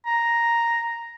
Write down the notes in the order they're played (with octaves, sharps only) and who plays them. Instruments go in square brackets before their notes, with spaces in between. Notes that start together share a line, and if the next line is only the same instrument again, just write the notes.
[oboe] A#5